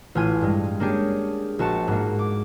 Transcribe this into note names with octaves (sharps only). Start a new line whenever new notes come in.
A1 F4 G#5 D#7
G2 G#3
A#3 C#4 D4 G4 G#4
A#1 F#4 A5 C#6 E7
G#2 A#3
D6